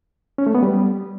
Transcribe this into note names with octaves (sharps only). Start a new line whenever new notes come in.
C#4
A3
B3
G3